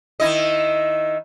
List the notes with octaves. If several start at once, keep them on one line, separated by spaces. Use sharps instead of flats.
D#3 E4 D#5